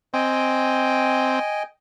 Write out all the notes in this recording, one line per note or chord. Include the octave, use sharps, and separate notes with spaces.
C4 D#5 G5 G#5